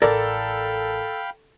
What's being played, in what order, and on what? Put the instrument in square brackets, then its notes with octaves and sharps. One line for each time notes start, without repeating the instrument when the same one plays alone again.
[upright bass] A1 [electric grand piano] A4 [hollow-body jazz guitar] A#4 D5 [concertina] F5 G5 B5